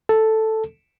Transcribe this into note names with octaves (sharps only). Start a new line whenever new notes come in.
A4